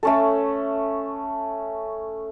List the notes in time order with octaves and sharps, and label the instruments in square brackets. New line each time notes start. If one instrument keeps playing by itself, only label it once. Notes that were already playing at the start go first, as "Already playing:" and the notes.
[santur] A3 C#4 A4